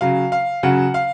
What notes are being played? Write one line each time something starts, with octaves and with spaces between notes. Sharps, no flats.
C#3 F#3 F5
F5
C#3 F#3 F#5
F5